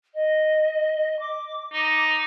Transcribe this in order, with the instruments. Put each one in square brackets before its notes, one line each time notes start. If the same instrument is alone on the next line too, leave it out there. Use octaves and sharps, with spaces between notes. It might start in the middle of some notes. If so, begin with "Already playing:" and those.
[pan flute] D#5
D6
[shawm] D#4 [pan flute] D6